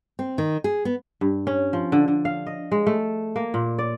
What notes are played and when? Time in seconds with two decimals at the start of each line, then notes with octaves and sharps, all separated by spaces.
0.19 C4
0.38 D#3
0.64 G#4
0.85 B3
1.21 G2
1.47 C#4
1.73 F3
1.92 D3
2.08 D3
2.25 F5
2.47 D#5
2.72 G#3
2.87 A3
3.36 A#3
3.54 A#2
3.78 D5